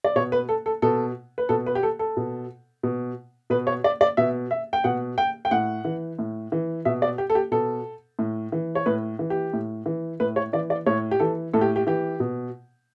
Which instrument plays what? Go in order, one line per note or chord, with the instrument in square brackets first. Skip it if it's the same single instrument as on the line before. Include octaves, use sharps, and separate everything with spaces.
[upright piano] D5
B2 C#5
B4
A4
A4
B2 A4
B4
B2 A4
B4
G4
A4
A4
B2
B2
B2 B4
C#5
D5
D5
B2 E5
E5
G5
B2 F#5
G5
G5
A2 F#5
E3
A2
E3
B2 E5
D5
G4
A4
G4
B2 A4
A2
E3
C#5
A2 B4
E3
G4
A2
E3
A2 B4
C#5
E3 D5
D5
A2 C#5
G4
E3 A4
A2 A4
G4
G4
E3 G4
B2